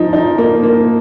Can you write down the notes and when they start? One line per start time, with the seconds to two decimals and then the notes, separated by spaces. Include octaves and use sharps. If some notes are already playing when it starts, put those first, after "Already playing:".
Already playing: F3 D#4
0.13 D#4
0.38 A#3
0.63 A#3